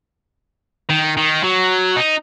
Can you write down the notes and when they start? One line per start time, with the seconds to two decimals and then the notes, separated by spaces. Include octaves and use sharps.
0.90 D#3
1.17 D#3
1.43 F#3
1.96 D#4